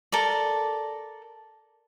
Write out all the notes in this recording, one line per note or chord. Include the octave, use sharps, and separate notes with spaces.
A4 A#4 D5